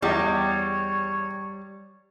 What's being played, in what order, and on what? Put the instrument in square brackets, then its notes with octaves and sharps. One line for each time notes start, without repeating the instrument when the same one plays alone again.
[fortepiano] E2 G4 D#5 [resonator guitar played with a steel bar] G3 [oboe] C#5